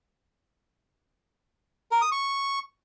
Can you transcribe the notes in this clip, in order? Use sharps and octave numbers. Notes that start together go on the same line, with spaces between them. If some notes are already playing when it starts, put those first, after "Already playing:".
A#4
D#6
C#6